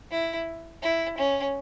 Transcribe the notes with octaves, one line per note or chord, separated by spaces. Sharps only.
E4
E4
C#4